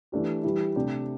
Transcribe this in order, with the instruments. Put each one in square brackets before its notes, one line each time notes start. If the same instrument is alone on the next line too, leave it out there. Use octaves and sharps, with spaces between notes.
[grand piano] E3 A3 D4 G4
E3 G3 E4
C3 A3 D4 G4